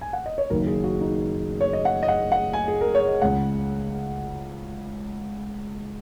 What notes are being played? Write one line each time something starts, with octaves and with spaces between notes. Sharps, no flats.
G#5
F#5
D#5
C#5
F#1 F#2 D#3 A#4
G#4
F#4
D#4
C#5
D#5
F#5
D#5
F#5
F#5
G#5
G#4
A#4
C#5
D#5
C#2 C#3 F#5